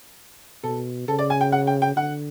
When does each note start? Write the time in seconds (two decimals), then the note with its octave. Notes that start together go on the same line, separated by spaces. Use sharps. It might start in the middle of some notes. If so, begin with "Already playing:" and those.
0.63 B2 A4
1.08 C#3 A4
1.19 D5
1.30 G#5
1.41 G5
1.52 F#5
1.67 G5
1.82 G5
1.96 D3 F#5